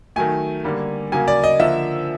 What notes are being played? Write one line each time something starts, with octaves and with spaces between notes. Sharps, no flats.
D#3 F#3 A3 G#5
D3 G3 A#3
C#3 F#3 A#3 G#5
D5
D#5
D3 F3 A#3 E5